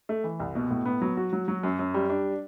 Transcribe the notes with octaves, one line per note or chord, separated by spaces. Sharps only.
A3
E3
C2
B2
A2
B3
F#3
F#4
F#3
F#3
F#2
F#2
G3
D4